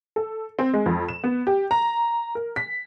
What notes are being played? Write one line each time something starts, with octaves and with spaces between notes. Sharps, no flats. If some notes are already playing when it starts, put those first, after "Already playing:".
A4
C4
G#3
F2
E7
B3
G4
A#5
A#4
B6